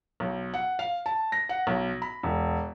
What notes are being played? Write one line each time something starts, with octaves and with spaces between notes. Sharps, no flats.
B1
F#5
F5
A5
A#6
F#5
B1
B5
E1